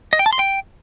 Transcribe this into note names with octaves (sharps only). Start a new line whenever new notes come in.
D#5
G5
A5
C6
G5